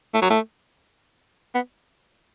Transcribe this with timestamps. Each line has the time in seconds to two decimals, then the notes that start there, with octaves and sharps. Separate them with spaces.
0.14 A3
0.22 F#3
0.30 A3
1.55 B3